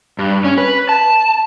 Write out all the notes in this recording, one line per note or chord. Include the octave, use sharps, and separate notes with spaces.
G2
C#4
B4
A5